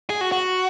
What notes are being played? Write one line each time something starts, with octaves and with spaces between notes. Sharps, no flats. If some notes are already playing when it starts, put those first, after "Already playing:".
G#4
F#4
F#4